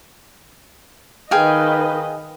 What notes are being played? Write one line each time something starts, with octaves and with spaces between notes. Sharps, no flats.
D#3 G#4 B4 D#5 F5 G5